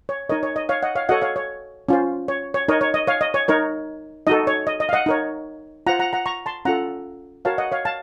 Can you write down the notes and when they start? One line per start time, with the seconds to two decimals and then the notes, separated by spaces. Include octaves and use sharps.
0.09 C#5
0.30 D#4 A#4 C#5 D#5
0.43 C#5
0.56 D#5
0.69 C#5 F5
0.83 D#5 F#5
0.96 C#5 F5
1.09 F#4 A4 C#5 D#5 F#5
1.22 C#5 F5
1.36 C#5
1.89 C#4 F4 C5
2.28 C#5
2.54 C#5
2.68 D#4 A#4 C#5 D#5
2.81 C#5
2.94 D#5
3.07 C#5 F5
3.21 D#5
3.34 C#5
3.48 D#4 A#4 C#5
4.27 D#4 F#4 A4 D#5
4.47 C#5
4.67 D#5
4.80 D#5
4.89 F5
4.93 D#5 F#5
5.06 D#4 A#4 C#5
5.87 F4 C5 F#5 A#5
5.99 F#5 A#5
6.13 F#5 A#5
6.26 A#5 C#6
6.46 A5 C6
6.65 C#4 F4 A4 F#5 A#5
7.45 F#4 A#4 C#5 F5 A5
7.58 D#5 F#5
7.72 C#5 F5
7.85 F5 A5